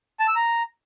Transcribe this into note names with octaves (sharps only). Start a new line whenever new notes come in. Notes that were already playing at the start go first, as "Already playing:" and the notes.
A5
E6
A#5